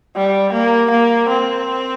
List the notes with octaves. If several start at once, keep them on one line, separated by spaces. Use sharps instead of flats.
G3
A#3
A#3
C4